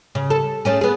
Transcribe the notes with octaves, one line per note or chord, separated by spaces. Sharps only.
C#3
A4
A3 C#4 G#4
B3 G#4